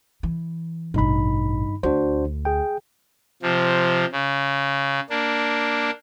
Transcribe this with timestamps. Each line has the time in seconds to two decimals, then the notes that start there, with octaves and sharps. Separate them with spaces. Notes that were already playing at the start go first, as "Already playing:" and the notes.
0.23 E3
0.94 A1 G2 B2 D#4 B5
1.83 D2 D4 F#4 C5
2.45 G#4 G5
3.42 C3 F3
4.12 C#3
5.10 A#3 D4